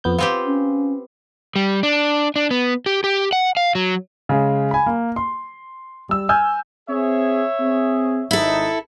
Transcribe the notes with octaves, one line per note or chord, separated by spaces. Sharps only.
F2 B3 G6
B3 C4 F4 G4
C#4
G3
D4
D4
B3
G4
G4
F#5
F5
F#3
C#3 G#3
G#5 B5
A#3
C6
G3 E6
G#5 E6 F6 G6
C4 G#4 C#5 E5
C4 G#4
G#1 D#4 E4 A4